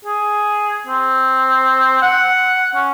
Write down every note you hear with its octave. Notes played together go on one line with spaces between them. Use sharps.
G#4
C4
F#5
C#4